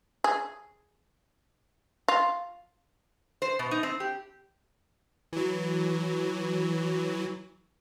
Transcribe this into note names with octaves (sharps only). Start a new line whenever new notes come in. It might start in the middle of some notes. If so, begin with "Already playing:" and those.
G#4
F4
C5
B2
D#4
C4
G4
E3 F#3